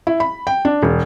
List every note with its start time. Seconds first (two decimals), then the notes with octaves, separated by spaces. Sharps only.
0.07 E4
0.20 B5
0.47 G5
0.65 D4
0.83 E1